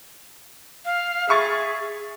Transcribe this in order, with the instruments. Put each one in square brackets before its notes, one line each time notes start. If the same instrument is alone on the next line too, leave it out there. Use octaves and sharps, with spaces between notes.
[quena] F5
[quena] G#4 [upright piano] E5 C#6 A6